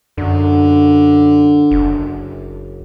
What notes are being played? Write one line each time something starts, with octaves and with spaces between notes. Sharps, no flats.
F#2 D3
F#1